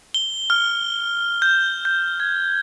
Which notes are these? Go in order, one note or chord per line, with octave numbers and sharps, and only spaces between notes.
G7
F6
G6
G6
G#6